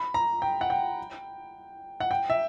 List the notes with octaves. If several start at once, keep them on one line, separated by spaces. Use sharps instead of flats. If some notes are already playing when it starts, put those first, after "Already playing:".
Already playing: B5
A#5
G5
F#5
G5
F#5
G5
E5